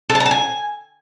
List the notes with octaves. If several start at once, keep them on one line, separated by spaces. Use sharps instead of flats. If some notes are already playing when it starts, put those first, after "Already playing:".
A4
A5
A#5
A5
G#5